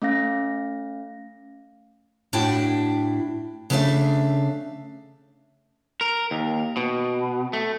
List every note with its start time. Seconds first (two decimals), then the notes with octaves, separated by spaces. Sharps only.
0.02 A3 C#4 F5 A#6
2.33 A2 D4 E4 F#4 G5 A5
3.70 C#3 A3 D4 B4 E5 F5
6.01 A#4
6.31 D#2
6.77 B2
7.53 A3